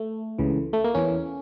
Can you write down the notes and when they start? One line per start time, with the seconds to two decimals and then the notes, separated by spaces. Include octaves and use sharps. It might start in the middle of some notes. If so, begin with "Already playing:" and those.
Already playing: A3
0.39 C#2 C#3 E3
0.73 A3
0.84 A#3
0.95 E2 E3 C#4